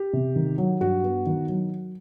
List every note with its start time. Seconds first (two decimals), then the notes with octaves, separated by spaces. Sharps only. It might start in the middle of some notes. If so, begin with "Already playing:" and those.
Already playing: G4
0.13 C3
0.36 D#3
0.58 F#3
0.81 G2 F#4
1.04 B3
1.26 D#3
1.49 F#3